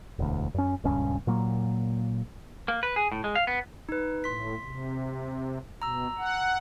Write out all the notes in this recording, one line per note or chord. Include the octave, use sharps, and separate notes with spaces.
E1 D2
F#2 C#4
D#1 C#2 G2 C#4
A#2 F#3 A#3
A#3
B4
G#4
A2
G#3
F5
B3
D#4 B4
A2 C6 B6
C3
B2 A#5 E6
F#5